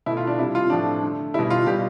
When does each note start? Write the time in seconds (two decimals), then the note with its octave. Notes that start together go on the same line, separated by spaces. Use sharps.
0.06 B2 A3 E4
0.17 F4
0.27 D4
0.38 C3 E4
0.41 G3
0.55 F4
0.70 A2 F3 A3 D4
1.03 D3 A3
1.34 B2 G3 E4
1.50 F4
1.67 B2 G3 G4